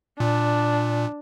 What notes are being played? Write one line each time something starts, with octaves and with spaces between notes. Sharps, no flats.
A#2 D4